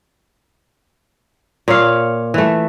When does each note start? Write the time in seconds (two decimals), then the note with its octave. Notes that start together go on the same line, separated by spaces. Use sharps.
1.68 A#2 C#5 F5
2.34 E3 A3